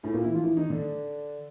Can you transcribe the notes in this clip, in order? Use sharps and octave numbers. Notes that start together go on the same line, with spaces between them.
A2 A3
A#2 A#3
E3 E4
F3 F4
E3 E4
D#3 D#4
D3 D4